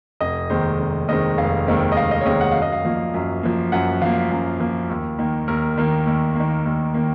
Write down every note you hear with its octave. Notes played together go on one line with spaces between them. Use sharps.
F1 D#5
D#2 D#3 G#3 C4 C5
F1
D#2 D#3 G#3 C4 D#5
F1 F5
D#2 D#3 G#3 C4
D#5
F1 F5
D#5
C#5
D#2 D#3 G#3 C4 D#5
F#5
F#2 F5
D#5
F5
F3 A#3
F#2
F3 A#3
F#2 F#5
F3 A#3 F5
F#2
F3 A#3
D#2
D#3 A#3
D#2 A#4
D#3 A#3
D#2
D#3 A#3
D#2
D#3 A#3